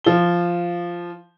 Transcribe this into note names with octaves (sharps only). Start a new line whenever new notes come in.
F3 G7